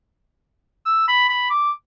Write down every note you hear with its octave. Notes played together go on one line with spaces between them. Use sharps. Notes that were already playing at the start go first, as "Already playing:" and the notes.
E6
B5
B5
D6